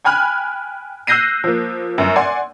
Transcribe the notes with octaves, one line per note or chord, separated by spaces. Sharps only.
G5 G#5 B5 F6 F#6
E6 F#6 G6 A#6 C7 D#7
F3 A#3
G1 F#2
D5 F#5 G#5 C6